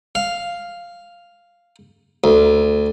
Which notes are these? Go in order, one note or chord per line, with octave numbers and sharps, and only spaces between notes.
F5
D2